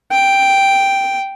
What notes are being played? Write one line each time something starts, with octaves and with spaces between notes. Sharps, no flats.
G5